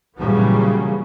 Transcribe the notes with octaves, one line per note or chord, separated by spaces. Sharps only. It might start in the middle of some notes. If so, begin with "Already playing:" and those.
A#2 C#3 E3 F#3 G3 B3